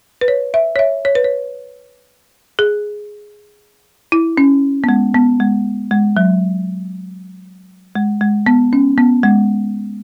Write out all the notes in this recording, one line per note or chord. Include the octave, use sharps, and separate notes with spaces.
B4
C#5
E5
C#5
E5
C#5
B4
C#5
G#4
E4
C#4
B3
G#3
B3
G#3
G#3
F#3
G#3
G#3
B3
C#4
B3
G#3